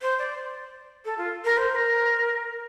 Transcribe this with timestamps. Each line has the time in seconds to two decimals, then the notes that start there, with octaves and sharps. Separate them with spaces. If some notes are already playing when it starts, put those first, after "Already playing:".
0.02 C5
0.19 D5
1.05 A4
1.18 F4
1.45 A#4
1.57 C5
1.71 C5
1.75 A#4